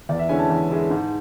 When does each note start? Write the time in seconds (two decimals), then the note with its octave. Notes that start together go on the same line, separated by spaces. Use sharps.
0.09 E2 D5
0.19 E5
0.29 D3 G#3 C#4 E4 G#5
0.39 A5
0.50 E2
0.70 D3 G#3 C#4 E4
0.90 G#2